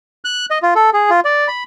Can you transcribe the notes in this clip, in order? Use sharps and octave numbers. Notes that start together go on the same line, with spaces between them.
F#6
D#5
F4
A4
G#4
F4
D5
B5